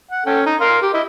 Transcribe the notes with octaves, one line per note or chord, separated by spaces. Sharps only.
F#5
C#4 A4 G5
D#4
A#4 F5 C6
G4
E4 D#5